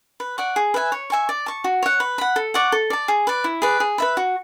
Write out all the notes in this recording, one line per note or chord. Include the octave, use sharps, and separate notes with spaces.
B4
D5 F#5 C#6
G#4
B4 E5 G#5
C#5
E5 G#5 C#6
D5
A5 C#6
F#4
C#5 F#5
B4
F#5 B5
A4
D5 F#5 C#6
A4
D5 A5
G#4
B4 D5
E4
G#4 B4 D5
G#4
B4 E5 B5
F#4